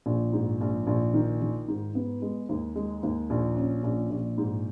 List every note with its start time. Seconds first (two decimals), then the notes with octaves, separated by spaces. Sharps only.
0.06 A#1
0.33 G#2
0.61 A#1
0.87 A#1
1.14 D#3
1.41 D#3
1.68 G#2
1.95 B3
2.22 G#3
2.49 D#2
2.76 G#3
3.03 D#2
3.30 A#1
3.56 C#4
3.83 A#1
4.11 A#1
4.38 G#2